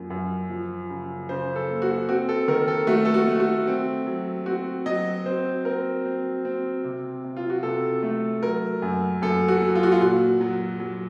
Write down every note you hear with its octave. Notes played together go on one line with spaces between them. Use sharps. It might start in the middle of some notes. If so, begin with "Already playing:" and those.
Already playing: F#2 F3 A#3
F#2
F3
C#3
C#3 C5
A4
A#3
F#4
C4 F#4
A4
D#3 A#4
A4
A3 F#4
A4
F#4
A3
F#4
C4
F#3
C4 F#4
F#3 D#5
C4 C5
C4 A#4
C4
C4
C3
C3
F4
F#4
C3 A4
A3
F#3 A#4
F#2
F#2 A4
F#4
F#3
F4
F#4
F4
A#2 F#4
F#3
F#3